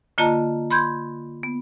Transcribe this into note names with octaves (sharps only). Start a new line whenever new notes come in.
D3 A#3 F4 D#5 A5 A#5
B5 C6 G6 G#6
B3